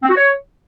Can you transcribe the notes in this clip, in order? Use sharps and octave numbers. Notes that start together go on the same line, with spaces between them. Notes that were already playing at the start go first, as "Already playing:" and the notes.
C4
F#4
C#5